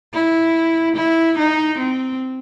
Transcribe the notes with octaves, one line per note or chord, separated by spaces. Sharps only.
E4
E4
D#4
C4